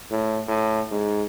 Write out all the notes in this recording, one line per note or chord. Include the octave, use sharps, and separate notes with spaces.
A2
A2
G#2